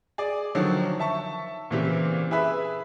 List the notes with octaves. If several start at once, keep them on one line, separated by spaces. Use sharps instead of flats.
G#4 D5
D3 D#3 F3 F#3
E5 A5 C#6
A#2 C#3 E3 C4 G4
E4 G#4 B4 E5